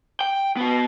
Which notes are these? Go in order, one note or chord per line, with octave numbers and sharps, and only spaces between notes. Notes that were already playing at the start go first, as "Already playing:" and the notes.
G5
B3 F#4